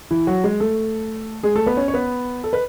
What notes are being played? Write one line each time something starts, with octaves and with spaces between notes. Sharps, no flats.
E3 E4
F#3 F#4
G#3 G#4
A3 A4
G#3 G#4
A3 A4
B3 B4
C#4 C#5
C#5
B3 B4
A4
B4